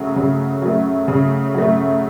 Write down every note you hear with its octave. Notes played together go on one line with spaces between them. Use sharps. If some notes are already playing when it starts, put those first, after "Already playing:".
Already playing: C#3 F#3 A3
C#3
F#3 A3
C#3
F#3 A3